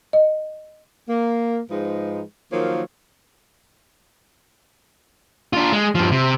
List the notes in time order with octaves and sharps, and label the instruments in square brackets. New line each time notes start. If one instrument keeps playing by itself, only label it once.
[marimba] D#5
[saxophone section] A#3
G#2 F3 G#3 D#4 B4
D#3 F3 F#3 A#3 C#5
[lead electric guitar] D4 F4
G#3
G2 F3
C3